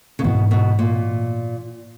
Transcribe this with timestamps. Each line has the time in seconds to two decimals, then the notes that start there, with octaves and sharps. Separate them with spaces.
0.19 C#3
0.24 G#2 B2 E3 B3
0.51 B2
0.79 A#2